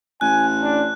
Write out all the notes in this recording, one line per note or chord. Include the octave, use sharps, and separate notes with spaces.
A1 G#5 F#6
D4